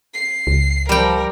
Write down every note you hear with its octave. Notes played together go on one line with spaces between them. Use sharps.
C7
C#2
F3 G3 A#4 G5